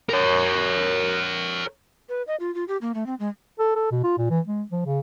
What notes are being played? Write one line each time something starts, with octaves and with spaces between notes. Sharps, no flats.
A#4 C#5
B4
D#5
F4
F4
G4
A#3
A3
C4
G#3
A4
A4
B2
F4
A#2
E3
G#3
F3
C#3